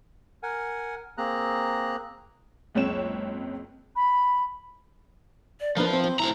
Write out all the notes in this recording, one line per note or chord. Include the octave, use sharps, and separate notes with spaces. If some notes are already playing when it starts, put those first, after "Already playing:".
A#4 F#5 G#5
A#3 C4 G#4 A#5 F#6
F#1 C#2 C4 C#5 E7
B5
D5
F3 A#3 D4 A#4 B4
C4 C5 E5
C5
A2 F3 E4 A#5